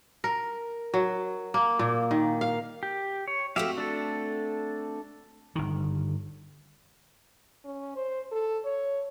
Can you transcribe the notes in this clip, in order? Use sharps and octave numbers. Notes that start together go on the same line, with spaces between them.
A#4
F#3
A#3
A#2
D#3
F5
G4
C#5
A3 C4 F#4 G4 E5 F5
D4 A4
G1 D#3
C#4
C5
A4
C#5